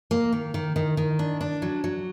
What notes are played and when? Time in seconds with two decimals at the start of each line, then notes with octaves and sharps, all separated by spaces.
0.11 A#3
0.32 D#3
0.54 D#3
0.76 D#3
0.97 D#3
1.19 D4
1.41 D4
1.62 F#3
1.84 F#3